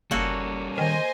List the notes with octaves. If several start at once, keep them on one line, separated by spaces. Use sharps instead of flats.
F#1 G3 A#3 C#4 F#4 A4
D#3 C5 D#5 G#5